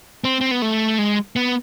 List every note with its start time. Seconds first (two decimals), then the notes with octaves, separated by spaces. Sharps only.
0.24 C4
0.41 C4
0.51 B3
0.62 A3
0.98 G#3
1.36 B3